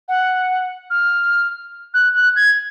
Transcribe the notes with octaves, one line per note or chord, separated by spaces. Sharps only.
F#5
F6
F#6
F#6
G#6